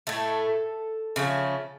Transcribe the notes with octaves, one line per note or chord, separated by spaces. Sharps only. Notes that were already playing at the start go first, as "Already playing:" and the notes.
A2 A3 A4
C#3 F3 A3